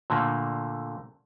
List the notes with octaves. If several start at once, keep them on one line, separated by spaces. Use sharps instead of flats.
A#2 D3 A3 A#3